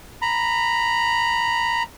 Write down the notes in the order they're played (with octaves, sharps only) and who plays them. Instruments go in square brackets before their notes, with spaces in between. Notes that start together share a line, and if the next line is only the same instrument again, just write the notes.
[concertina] A#5 B5